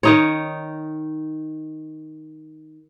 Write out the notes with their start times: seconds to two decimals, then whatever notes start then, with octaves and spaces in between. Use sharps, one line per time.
0.03 D#3 D#4 C#5